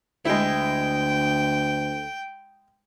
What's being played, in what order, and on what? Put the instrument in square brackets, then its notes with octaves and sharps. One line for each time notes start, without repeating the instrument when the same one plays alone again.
[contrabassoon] D2 [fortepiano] G#3 E4 [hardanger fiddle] G5